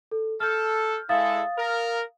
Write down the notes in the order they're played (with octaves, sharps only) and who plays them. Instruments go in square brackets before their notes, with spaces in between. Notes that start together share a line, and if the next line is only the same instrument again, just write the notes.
[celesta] A4
[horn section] A4 [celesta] F6 G6
[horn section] G#3 E4 A4 [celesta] F5 D#6 A6
[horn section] A#4